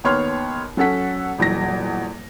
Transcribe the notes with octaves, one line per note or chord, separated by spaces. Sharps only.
D#2 B3 C#5 C6 F6
F#3 C#4 A4 F#5 B6
D#1 E2 F#3 A#6